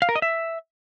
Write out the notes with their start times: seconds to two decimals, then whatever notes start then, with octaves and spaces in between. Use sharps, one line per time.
0.02 F5
0.09 A#4
0.16 D#5
0.22 E5